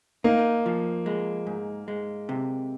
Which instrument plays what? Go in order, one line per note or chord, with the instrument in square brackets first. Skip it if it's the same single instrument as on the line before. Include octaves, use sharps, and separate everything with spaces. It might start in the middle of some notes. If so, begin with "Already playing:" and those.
[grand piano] A#3 [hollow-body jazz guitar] D#4
[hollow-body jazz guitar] F3
G#3
G#2
G#3
C3